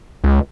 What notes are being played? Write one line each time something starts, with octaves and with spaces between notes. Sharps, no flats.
C#2